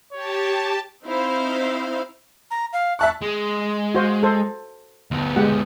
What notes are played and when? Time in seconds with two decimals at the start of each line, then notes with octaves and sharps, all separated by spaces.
0.13 G4 C#5 A5
1.04 C4 D#4 E4 C5 F5
2.51 A#5
2.73 F5
2.99 E5 A5 C#6 F#6
3.22 G#3
3.95 F#4 C5 F5
4.23 A4 C5
5.11 D2 B3
5.36 G#3 G4 F#5